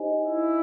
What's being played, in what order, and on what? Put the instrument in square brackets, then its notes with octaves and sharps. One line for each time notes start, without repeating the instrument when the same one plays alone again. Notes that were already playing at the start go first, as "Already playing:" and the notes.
Already playing: [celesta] D#4 G4 C5 D#5 G#5
[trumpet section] E4